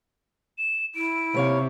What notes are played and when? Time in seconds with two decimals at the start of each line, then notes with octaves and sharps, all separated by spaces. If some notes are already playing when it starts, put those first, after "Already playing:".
0.58 E7
0.95 E4 D7
1.34 D#2 C3 C#5 F5